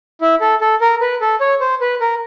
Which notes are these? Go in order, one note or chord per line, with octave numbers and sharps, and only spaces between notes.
E4
A4
A4
A#4
B4
A4
C#5
C5
B4
A#4